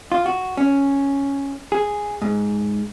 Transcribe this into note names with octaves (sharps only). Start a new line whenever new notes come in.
F4
F#4
C#4
G#4
G#2